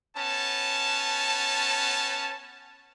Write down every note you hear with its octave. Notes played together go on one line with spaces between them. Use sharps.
B3 C#4 A5